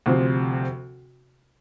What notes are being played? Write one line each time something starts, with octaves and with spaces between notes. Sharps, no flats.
D2 C3 F3 C4